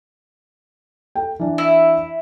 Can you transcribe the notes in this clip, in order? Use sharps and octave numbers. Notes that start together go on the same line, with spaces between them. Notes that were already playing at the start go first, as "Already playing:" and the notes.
A4 G5
E3 D4
E4